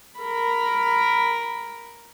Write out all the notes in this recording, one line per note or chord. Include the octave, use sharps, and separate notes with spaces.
A#4 B5